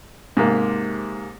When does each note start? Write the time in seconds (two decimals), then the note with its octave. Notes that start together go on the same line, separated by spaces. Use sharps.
0.37 G#2 C3 A#3